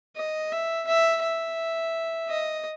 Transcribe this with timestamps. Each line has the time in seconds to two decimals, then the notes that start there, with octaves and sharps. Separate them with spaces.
0.17 D#5
0.52 E5
0.87 E5
1.23 E5
2.29 D#5